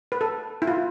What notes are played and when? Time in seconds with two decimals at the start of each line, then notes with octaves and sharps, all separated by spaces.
0.12 B4
0.21 A4
0.62 E4
0.67 F4